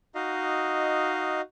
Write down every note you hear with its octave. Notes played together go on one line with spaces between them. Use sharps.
D#4 F#4 D#5 F5